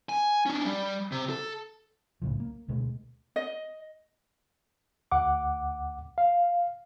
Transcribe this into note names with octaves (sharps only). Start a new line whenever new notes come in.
G#5
C#4 D4
G3
C3
A4
C2 A2 C#3 F3
A#3
D2 B2 G#3
D#5
D2 F#5 D6
F5